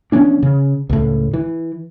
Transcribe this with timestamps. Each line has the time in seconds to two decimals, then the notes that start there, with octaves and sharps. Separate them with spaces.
0.12 E3 B3 C#4 D4
0.43 C#3
0.89 C#2 A2
1.33 E3